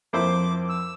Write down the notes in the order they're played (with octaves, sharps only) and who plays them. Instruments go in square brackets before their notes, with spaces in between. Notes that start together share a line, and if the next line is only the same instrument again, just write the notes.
[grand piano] F2 [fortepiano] A#3 E4 C5 [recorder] D6
[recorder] E6